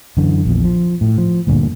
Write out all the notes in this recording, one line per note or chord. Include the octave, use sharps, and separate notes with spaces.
F#2 D3 E3
A#1 E2
F3
A2
F3
D2 G2 A#2 D3